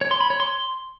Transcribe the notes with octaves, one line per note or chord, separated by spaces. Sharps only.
C#5
C6
B5
C#5
C6